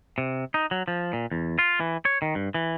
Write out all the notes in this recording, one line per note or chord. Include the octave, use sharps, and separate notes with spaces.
C3
D#4
F#3
F3
A#2
E2
F4
E3
C#5
D#3
G2
E3